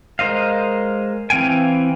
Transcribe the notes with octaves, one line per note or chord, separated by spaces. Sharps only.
G#3 A#4 C5 D#5 F5
E3 C4 F5 G5 G#5